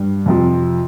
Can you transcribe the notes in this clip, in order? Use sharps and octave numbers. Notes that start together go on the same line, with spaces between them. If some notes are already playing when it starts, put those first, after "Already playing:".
Already playing: G2 G3
F2 C3 F3